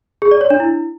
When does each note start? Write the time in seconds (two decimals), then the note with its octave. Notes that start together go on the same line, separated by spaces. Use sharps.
0.22 G#4
0.31 D5
0.41 C#5
0.50 D4
0.60 E4